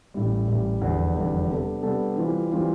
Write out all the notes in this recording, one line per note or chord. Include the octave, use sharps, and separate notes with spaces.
A1 A2 G3
A1 A2 G3
F1 E2 D3 G3
F1 E2 D3 G3
C3 G3 B3 D4 A4
C3 G3 B3 D4 A4
E3 G3 C4 F4 B4
E3 G3 C4 F4 B4